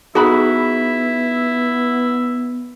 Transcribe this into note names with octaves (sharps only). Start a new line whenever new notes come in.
B3 D#4 E4 F#4 G#4 B5